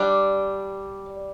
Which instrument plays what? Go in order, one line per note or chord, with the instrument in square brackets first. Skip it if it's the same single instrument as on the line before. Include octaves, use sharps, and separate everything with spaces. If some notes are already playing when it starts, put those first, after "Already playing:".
Already playing: [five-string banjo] G3 D4 D5